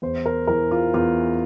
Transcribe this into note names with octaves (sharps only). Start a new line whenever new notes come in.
E2 C5
A#4
E3 A#4
F4
E2 F4